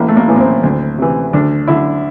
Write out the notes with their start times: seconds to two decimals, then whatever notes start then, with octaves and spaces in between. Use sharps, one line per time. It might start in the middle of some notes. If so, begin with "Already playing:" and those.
Already playing: A1 A#3
0.08 A3
0.17 A#3
0.28 A2 E3
0.36 A#3
0.40 C4
0.63 D2
0.98 C3 E3
1.33 D2 D4
1.67 D3 E4